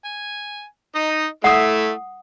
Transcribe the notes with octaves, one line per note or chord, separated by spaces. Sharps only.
G#5
D#4 D#5
A3 E4 F#5 D#6